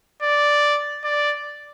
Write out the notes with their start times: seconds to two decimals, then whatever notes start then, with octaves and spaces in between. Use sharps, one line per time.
0.23 D5
1.04 D5